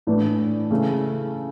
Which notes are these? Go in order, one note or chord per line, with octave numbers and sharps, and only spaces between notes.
A2 E3 A3 D4
C#3 E3 A3